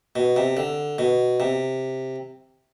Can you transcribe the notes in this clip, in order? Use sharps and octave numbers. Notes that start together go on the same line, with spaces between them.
B2
C3
D3
B2
C3